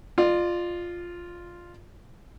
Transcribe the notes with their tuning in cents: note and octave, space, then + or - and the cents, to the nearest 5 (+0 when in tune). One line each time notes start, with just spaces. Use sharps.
F4 +0 D5 +40